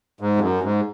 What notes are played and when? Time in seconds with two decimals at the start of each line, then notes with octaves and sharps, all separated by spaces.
0.20 G#2
0.37 F2
0.41 F#2
0.63 G#2